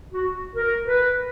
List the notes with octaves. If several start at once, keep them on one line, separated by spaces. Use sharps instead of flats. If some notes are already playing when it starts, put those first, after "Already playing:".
F#4
A#4
B4